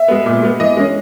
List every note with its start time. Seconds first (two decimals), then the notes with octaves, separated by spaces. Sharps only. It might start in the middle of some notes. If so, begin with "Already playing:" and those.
Already playing: E5
0.08 G#3 B3
0.26 A#2
0.43 G#3 B3
0.60 E3 D#5
0.77 G#3 C#4